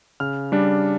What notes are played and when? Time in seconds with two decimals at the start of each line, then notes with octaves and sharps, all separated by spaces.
0.20 C#3 F6
0.52 G3 D4